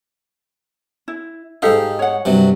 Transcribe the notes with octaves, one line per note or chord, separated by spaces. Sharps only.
E4
G#2 D#4 G4 A4 F5
C#5 F#5
G2 C3 F#3